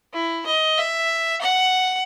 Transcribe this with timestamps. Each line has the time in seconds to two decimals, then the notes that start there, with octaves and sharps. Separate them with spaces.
0.14 E4
0.46 D#5
0.78 E5
1.41 F#5